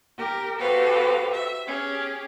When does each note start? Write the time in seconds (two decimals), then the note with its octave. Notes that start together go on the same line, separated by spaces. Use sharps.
0.18 G4 A#4
0.59 F#4 G4 A4 B4 C5 F5
1.33 E5
1.67 C#4 G4 G#4